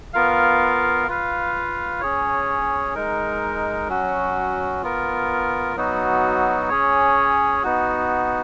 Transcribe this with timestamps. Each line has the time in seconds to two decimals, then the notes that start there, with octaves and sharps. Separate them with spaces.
0.14 B3 F4 A#4 F5
1.08 F4 B4 F5
2.00 C#4 G#4 C#5
2.95 G#3 D#4 A#4
3.88 F#3 C#4 F#4
4.83 B3 F4 A#4
5.76 F#3 B3 D#4 F#4
6.69 C#4 G#4 C#5
7.63 B3 D#4 F#4